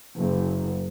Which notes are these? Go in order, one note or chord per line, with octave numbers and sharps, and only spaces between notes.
F#1